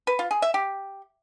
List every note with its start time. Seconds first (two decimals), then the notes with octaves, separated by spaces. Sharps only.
0.07 B4
0.19 F4
0.31 G#4
0.42 E5
0.54 G4